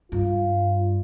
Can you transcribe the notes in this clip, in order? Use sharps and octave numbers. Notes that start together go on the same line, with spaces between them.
G2 F4